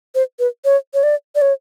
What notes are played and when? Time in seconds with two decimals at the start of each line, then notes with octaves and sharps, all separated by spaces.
0.15 C5
0.39 B4
0.65 C#5
0.94 C#5
1.03 D5
1.35 D5
1.42 C#5